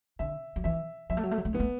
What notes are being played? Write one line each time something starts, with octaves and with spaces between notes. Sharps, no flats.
D3 E5
F#3
E3 E5
F#3 E5
A3
F#3
A3
F#3
A3
F#3 B3
A3